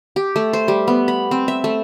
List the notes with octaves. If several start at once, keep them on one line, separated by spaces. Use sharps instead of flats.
G4
A3
C5
G3
B3
B5
C4
E5
A3